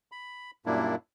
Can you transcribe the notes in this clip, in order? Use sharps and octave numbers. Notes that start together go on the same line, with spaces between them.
B5
F#2 A#2 G3 A#3 D4 E4